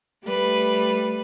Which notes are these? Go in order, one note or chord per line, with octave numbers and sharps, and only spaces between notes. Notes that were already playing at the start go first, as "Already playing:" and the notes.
G3 A3 B4